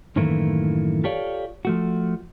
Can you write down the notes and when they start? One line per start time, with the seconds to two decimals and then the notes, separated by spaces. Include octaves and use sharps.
0.16 F#2 A2 D#3 E3 A3 A#3
1.04 F4 G4 A4 C#5 D5 F5
1.65 F3 A3 F#4